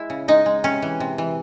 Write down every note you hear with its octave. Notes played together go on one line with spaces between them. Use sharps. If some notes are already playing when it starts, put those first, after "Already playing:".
Already playing: G#3 E4
C#3
G#3 D#4
G#3
C3 C#4
E3
C3
E3